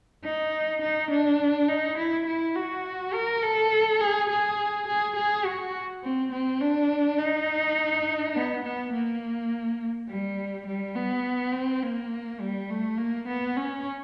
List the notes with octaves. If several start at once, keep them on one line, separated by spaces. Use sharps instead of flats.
D#4
D#4
D4
D#4
E4
E4
F#4
A#4
A4
G#4
G#4
G#4
G#4
F#4
C4
C4
D4
D#4
B3
B3
A#3
G3
G3
B3
C4
A#3
G3
A3
A#3
B3
C#4